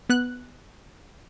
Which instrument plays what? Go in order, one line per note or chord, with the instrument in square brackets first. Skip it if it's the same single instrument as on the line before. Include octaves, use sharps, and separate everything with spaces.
[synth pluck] B3 F#6